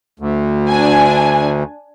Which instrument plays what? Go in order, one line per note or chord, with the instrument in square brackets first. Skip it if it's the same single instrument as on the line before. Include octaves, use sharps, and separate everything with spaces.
[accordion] D2
[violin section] D4 G#5